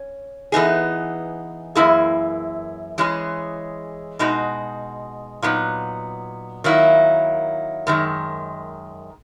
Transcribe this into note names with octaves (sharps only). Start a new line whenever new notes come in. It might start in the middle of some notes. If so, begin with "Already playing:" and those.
Already playing: C#4
E3 B3 D#4 G#4
F#2 E3 A#3 E4 G#4
E3 G#3 C#4 G#4
B2 G#3 D#4 F#4
A#2 F#3 B3 D#4
D#3 F#3 A#3 E4
F#2 D#3 G#3